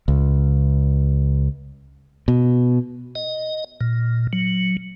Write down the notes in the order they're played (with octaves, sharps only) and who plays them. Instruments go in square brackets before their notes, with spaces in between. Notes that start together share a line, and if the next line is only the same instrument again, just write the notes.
[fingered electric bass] C#2
B2
[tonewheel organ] D#5
A#2
F#3